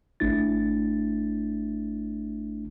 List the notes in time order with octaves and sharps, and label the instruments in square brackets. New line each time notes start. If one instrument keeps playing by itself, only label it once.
[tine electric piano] G#1 A3 D4 E4 A6